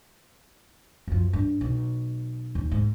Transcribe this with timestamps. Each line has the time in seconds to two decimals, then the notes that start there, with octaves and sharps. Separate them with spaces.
1.08 F#2 F3
1.33 G2
1.61 B1
2.55 D#2
2.71 G#2